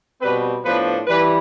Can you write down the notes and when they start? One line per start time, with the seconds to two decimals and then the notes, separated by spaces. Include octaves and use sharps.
0.21 B2 G3 C4 B4
0.65 A2 F3 B3 D4 B4
1.07 E3 G3 B4